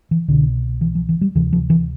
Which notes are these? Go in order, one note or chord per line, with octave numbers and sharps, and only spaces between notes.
E3
C2 B2 D3
E3
F3
E3
G3
D2 C3 E3
F3
E3